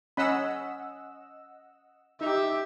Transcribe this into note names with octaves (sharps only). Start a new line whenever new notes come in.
C#4 D#5 F#5 B5 E6
D#4 G4 E5